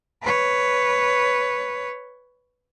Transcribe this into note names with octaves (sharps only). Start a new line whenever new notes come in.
B4 C#5